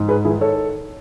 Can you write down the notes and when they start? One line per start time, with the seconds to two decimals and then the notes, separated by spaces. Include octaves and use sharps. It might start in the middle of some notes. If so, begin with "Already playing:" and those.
Already playing: G#2
0.08 G#4 B4
0.25 D#3 E4 G#4
0.41 A4 C#5